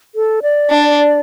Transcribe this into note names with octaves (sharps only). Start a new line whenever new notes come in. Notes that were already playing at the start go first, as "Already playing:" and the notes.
A4
D5
D4